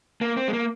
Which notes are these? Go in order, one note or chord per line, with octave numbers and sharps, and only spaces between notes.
A#3
C4
G#3
A#3